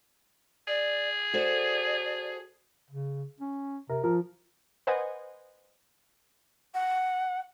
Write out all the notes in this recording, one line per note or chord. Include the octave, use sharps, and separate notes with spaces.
G#4 D5
F#4 A4 C5 D5
C#3
C#4
C3 A#4
F3 A#4
B4 C5 D#5 F#5 G#5
F#5